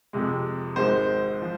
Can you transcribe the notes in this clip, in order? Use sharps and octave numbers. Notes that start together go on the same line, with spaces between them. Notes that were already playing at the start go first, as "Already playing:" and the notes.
F2 C3 G#3
G#1 G#2 G#3 C5
F3